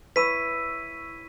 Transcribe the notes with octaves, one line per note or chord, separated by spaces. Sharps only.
E4 B4 C#5 B5 E6 B6 D#7